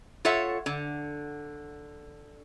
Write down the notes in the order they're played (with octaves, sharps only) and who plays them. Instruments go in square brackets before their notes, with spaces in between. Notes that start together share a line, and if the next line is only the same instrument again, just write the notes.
[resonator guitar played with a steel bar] F4 A4 C#5 E5 F#5
D3